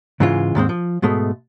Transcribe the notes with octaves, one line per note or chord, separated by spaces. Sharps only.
G#2 C#3 E3 G#3 F4
D#2 G#2 G#3 C4
F3
G#2 B2 G#3 A3